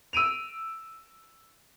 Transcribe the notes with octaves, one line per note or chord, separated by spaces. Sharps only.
E6 D7 D#7 F7